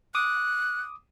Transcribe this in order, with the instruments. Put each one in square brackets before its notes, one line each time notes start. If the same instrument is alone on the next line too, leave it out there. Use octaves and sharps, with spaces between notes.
[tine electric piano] D6 D#6 [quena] F#6